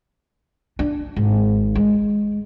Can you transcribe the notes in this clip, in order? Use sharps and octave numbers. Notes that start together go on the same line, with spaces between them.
D4
G#1
G#3